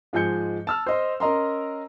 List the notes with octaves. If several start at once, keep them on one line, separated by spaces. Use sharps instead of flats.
G#2 F3 G#3 G#5 G6 C#7
A5 E6 F6
C5 D#5 C6
C#4 A#4 D#5 A#5 C6